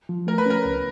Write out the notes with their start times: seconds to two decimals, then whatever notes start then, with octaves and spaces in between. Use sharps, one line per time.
0.09 F3
0.27 A3 A#4
0.38 B4
0.46 C#4 A#4
0.65 C#2